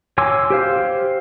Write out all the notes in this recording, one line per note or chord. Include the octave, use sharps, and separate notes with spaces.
C#5 G#5 C6 D6 E6
G4 C5 F5